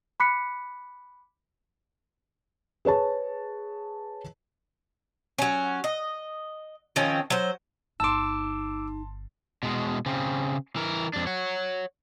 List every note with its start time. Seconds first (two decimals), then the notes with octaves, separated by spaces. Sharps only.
0.20 B5 D6 F#6 B6 C#7
2.85 G#4 B4 C#5 A5
5.38 F#3 C#4
5.84 D#5
6.96 D#3 F3 C4 C#4
7.30 F#3 C5
8.00 G1 D#4 A5 C6 D6 E6
9.63 B2 G#3
10.06 C#3 C4
10.76 E3 A#4
11.13 F2 D4
11.27 C#5 F#5